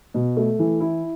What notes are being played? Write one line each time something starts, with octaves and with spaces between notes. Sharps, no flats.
B2
A3
E3
E4